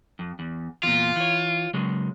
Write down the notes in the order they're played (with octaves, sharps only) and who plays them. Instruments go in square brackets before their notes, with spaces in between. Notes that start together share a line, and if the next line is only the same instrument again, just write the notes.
[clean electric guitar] F2
E2
[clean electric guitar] E2 A#2 [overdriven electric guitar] F4
[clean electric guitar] E3 C#5
C#3 F#3 G#3